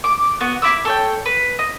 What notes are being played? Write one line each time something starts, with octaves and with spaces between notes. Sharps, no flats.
D6
B3 F#4
E4 B5 D6 E6
A4 C#5 G5
B4
D#5